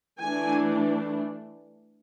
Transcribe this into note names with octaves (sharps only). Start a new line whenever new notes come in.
E3 A3 D4 G#5